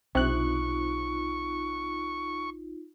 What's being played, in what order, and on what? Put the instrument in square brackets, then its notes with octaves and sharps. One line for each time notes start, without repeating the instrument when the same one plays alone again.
[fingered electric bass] B1 D4 [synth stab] C3 F#6 [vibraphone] D#4 F4 [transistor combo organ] C#6